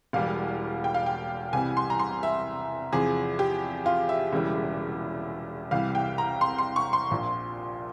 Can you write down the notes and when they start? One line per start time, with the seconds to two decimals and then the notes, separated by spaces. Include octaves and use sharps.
0.13 E1 E2 E3 G3 F5
0.84 G5
0.94 F5
1.06 G5
1.53 C2 C3 E3 G3 G#5
1.77 C6
1.90 A#5
1.99 C6
2.23 E5
2.92 E2 C3 F3 G#4
3.39 G4
3.86 F4
4.09 E5
4.32 E1 E2 C#3 E3 G3
5.71 C2 C3 E3 G3 F5
5.95 G5
6.18 A#5
6.41 C6
6.58 C6
6.76 C#6
6.93 C6
7.11 A#1 A#2 F3